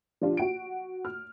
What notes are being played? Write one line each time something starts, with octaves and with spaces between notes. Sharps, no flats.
F3 D4 F4 G4
F#4 F#5 D7
F6